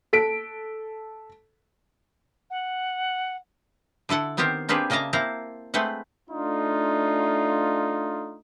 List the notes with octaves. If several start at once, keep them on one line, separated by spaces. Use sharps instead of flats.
A4 B6 D7
F#5
D3 E4 A4 F#5
D#3 B3 C4 G4 A#4 C5
A#3 C4 D4 G4 G#4 B4
C#3 A#3 D#5 E5 A5 A#5
A#3 C4 E4 C5 A5 A#5
G#3 A3 C4 B4 F#5
A3 D4 D#4 F4